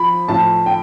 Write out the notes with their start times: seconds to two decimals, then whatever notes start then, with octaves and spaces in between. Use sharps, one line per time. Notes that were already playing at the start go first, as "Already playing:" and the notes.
Already playing: F3 B5
0.28 A2 F3 A3 A5
0.66 G5